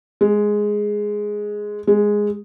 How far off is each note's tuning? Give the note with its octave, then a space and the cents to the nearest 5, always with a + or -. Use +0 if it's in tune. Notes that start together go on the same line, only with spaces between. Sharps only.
G#3 +0
G#3 -5